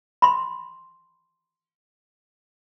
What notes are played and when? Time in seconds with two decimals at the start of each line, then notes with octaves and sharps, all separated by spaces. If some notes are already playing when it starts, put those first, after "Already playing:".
0.22 B5 C6